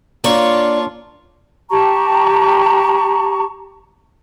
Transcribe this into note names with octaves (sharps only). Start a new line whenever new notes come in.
A#3 D4 F4 C#5 C#6
G4 A5 A#5 C#6